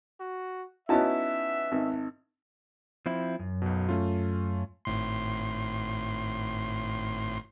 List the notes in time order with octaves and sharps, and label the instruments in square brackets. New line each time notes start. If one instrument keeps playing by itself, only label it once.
[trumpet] F#4
[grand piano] B3 C#4 D#4 [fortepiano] E4 F#4 A5 [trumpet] E5
[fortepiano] G#1
[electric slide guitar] F3 C4 E4
F#2
[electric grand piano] B1 B2
A3 C#4 F4
[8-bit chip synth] G#1 A2 C6